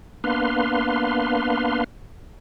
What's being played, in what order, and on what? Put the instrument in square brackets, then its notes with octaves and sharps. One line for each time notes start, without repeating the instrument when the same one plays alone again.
[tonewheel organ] A#3 B3 D4 B4 F5 C6